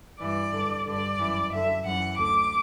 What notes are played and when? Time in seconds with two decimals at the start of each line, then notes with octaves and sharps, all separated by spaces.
0.19 G2 E3 D5
0.52 G2 D3
0.86 G2 D3 D5
1.18 F#2 E3
1.51 F#2 D3 E5
1.85 F#2 E3 F#5
2.18 D2 D3 D6